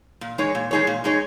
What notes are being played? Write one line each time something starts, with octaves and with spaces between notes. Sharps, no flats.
A#2
G#3 D#4 G#4 C#5
A#2
G#3 D#4 G#4 C#5
A#2
G#3 D#4 G#4 C#5